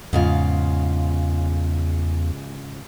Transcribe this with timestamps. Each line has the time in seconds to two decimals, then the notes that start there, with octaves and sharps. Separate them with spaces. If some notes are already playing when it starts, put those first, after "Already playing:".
0.13 E2 G#2 C#3 F4